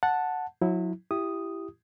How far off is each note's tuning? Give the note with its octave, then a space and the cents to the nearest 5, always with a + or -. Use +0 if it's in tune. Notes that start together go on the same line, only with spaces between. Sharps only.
F#5 -5 A5 +0
F#3 -30 E4 -15
E4 +20 G4 +0 D#6 +0